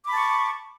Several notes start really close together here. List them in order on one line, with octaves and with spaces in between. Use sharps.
D6 B5 A5 C#6